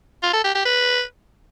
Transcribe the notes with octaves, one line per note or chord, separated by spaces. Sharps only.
F4
A4
G4
G4
B4